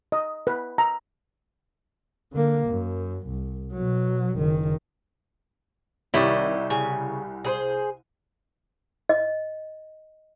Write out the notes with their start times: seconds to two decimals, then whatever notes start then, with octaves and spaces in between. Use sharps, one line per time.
0.12 D#5
0.47 B4
0.78 A#5
2.33 D3 A#3
2.68 F#2
3.27 C2
3.73 B2 F#3
4.38 F#1 D#3
6.14 C2 D#3 G3 E4 G4 C#5 D#5
6.70 C#3 G#5
7.45 G#4 B4 C5
9.09 D#5